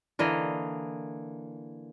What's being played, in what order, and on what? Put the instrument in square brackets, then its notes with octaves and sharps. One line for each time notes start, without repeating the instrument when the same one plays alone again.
[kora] D3 E3 A#3 D#5